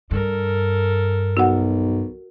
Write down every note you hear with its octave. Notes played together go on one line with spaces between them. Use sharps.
G2 A4 A#4
B1 F#4 F#5